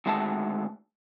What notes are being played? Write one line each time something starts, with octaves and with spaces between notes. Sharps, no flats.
D2 D#3 G#3 F#4 E5 A5